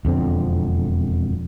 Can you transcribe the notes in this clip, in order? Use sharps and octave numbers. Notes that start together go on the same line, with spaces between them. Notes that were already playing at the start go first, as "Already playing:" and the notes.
E1 F2 D3 C4